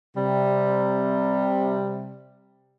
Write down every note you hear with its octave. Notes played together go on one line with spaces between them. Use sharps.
C3 G3